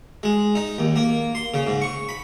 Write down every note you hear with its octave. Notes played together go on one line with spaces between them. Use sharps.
G#3
D#4
D#2
A#3
C6
C#3
G#2
C#6
B5